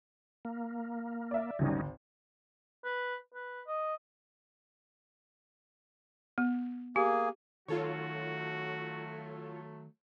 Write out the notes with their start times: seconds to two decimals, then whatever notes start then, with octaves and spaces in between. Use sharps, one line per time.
0.45 A#3
1.31 D5 E5
1.59 G#1 D2 G3 C#4 D#4
2.85 B4
3.34 B4
3.67 D#5
6.38 B3
6.96 A#3 G4 G#4 G#5
7.68 D#3 F#3 A3 F4 F#4 A4 C#5